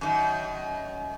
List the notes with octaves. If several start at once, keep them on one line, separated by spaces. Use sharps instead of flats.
F#2 D3 D#3